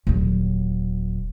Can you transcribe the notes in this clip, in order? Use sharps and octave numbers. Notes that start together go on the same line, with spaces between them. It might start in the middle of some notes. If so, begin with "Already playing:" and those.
D#1 F#3